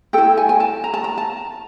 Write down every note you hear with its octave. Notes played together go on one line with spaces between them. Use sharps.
E4 A4 G5
G#5
G#5
A5
A#5
A5
A#5
A5